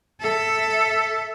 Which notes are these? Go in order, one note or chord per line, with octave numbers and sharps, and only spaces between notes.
A4 E5